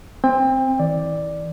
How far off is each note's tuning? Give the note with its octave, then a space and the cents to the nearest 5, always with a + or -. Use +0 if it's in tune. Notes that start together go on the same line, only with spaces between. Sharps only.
C4 +0 G5 +30
E3 -45 D5 +0